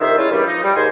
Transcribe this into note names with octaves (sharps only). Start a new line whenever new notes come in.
C2 F2 D#3 A#4 C5 E5
G3 G#3 C#4 E4 F4
G2 A#2 C#3 E3 G3
F3 D#4
G3
D#2 G#2 C5 G#5